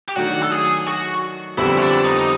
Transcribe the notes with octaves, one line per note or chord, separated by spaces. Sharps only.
G4
D#3 F#3 A3 D4 F#4
A4
G#4
F#4
F2 D3 G3 B3 E4
C#4
D4
D#4
D#4